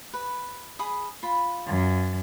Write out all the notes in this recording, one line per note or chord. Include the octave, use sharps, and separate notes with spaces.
B4
G#4 B5 D#6
F4 B5
F#2